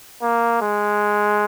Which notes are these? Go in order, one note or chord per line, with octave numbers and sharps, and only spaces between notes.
A#3
G#3